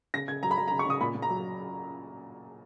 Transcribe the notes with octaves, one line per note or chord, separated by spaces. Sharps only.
C#3 A#6
C#3 G#6
F#3 A#5
B5
F#3 A#5
A#5
C#3
C#6
C#3 D#6
A#2 B5
A#2
A#5
F#3